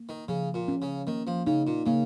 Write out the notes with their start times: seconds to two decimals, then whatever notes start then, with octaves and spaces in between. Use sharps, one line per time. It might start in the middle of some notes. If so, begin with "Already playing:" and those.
Already playing: A#3
0.09 D#3
0.28 C#3 F3
0.54 A#2
0.68 C#4
0.82 C#3
1.07 D#3 A#3
1.27 F3
1.47 C#3 D#4
1.67 A#2
1.86 C#3 A#3